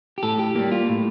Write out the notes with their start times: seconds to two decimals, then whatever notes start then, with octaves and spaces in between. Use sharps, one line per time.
0.18 G4
0.23 A2 A4
0.39 G4
0.55 G3 A#3 G4
0.71 F4
0.89 A2